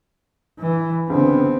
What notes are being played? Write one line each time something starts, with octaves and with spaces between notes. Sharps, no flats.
E3
C#2 D3 B3 C4